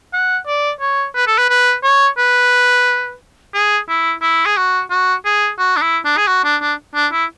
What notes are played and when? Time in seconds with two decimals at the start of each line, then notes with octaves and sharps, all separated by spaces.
0.13 F#5
0.47 D5
0.81 C#5
1.15 B4
1.27 A4
1.38 B4
1.49 B4
1.83 C#5
2.18 B4
3.54 G#4
3.89 E4
4.22 E4
4.46 G#4
4.57 F#4
4.90 F#4
5.25 G#4
5.59 F#4
5.77 D4
5.82 E4
6.05 D4
6.17 G#4
6.27 F#4
6.44 D4
6.62 D4
6.95 D4
7.12 E4